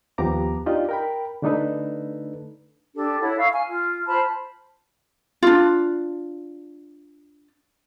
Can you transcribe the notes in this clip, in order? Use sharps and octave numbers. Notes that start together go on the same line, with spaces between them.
D#2 F3 B3 G4 A#5 D6
D4 D#4 F4 G4 D5 D#5
A#4 G5 B5
D3 A3 D4 D#4 A4 B4
D4 G4 A4
E4 A4 C#5 F#5
F5 C#6 E6
G#5 F6
F4
F4 C5 A5 B5
D4 F4